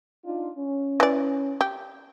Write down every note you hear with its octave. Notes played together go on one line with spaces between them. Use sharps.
D4 D#4 F4
C#4
E3 D5
G4